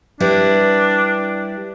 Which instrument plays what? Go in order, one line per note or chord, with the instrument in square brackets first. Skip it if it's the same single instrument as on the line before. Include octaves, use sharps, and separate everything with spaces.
[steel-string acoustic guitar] G3 E4 B4 [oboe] D4